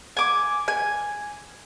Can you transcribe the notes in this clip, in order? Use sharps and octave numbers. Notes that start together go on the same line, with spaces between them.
G#5 D6
G#5